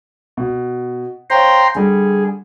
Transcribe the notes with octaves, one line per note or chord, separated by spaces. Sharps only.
B2
C5 C#5 F5 G5 A#5 C6
D3 G3 G#4